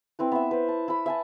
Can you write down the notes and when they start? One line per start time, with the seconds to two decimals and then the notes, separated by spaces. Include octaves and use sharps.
0.19 C4 E4 B4
0.32 B3 E5
0.51 B4 C5
0.68 A5
0.88 E4 B5
1.06 E5 G#5 A5